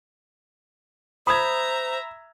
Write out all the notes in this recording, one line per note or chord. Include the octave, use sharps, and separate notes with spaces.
C5 E5 A#5 B5 D#6 G#6